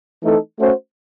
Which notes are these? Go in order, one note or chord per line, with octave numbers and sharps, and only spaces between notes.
E3 A3 C4 D#4 A4
A3 C#4 F#4 C5